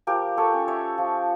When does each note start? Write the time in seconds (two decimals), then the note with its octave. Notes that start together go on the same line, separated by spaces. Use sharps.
0.07 F3 G4 A#4
0.37 A4 C#5
0.53 C#4
0.68 C#5 E5
0.98 F3